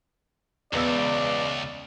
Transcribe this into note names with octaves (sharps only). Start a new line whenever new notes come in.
E1 C#2 B3 D5 E6